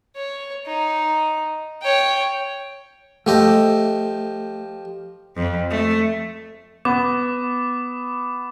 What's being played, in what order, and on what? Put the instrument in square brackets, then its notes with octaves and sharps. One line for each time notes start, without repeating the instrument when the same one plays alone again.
[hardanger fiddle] C#5
D#4
C#5 G5
[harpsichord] F3 G4 D#5 [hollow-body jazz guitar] A3
[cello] F2
A3
[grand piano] B3 [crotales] D6